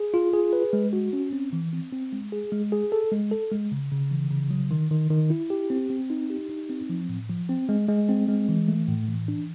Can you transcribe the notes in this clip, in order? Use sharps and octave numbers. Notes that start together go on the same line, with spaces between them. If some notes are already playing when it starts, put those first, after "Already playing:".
Already playing: G#4
F4
G#4
B4
G#3
F#4
C#4
C4
E3
C4
C4
G#3
G#4
G#3
G#4
A4
G#3
A4
G#3
C#3
C#3
E3
C#3
F#3
D#3
D#3
D#3
E4
G4
C4
C4
D#4
G4
D#4
C4
F3
A2
F3
C4
G#3
G#3
C4
G#3
E3
A3
A2
E3
D4